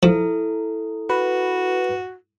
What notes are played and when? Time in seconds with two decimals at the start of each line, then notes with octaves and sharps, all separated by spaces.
0.03 F3 E4 A4
1.10 F#4 B4